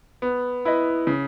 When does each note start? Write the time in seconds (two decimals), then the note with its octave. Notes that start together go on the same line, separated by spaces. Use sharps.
0.22 B3
0.65 E4 B4 D#5
1.07 C#3